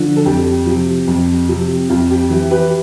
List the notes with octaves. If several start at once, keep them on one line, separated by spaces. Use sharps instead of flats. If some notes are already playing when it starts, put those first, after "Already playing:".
Already playing: D3 F3
A4
F2 G4
C3 F3
F2
C3 F3
F2 F4
G4
E3 G4
G4 B4